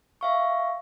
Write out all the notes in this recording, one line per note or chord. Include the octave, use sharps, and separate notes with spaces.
E5 F5 C#6